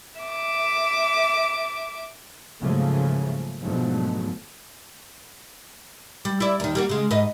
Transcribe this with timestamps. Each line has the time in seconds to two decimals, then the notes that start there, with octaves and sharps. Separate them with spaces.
0.21 E5 D6
2.61 G#2 C#3 F3 F#3 A3 A#3
3.62 G#2 B2 D3 F3 F#3 A3
6.25 G3
6.40 E4 D5
6.60 D#2 D#3
6.75 G3 A#3 F#4
6.89 C#3 G#3
7.11 G#2 B4 D#5